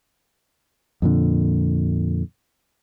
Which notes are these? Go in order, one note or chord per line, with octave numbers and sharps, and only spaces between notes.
F2 A#2 D3